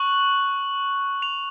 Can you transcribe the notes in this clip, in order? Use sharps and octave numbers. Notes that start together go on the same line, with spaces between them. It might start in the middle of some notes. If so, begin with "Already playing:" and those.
Already playing: C#6 F#6 F#7
F7